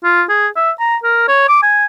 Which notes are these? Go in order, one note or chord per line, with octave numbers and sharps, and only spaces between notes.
F4
G#4
E5
A#5
A#4
C#5
D6
G#5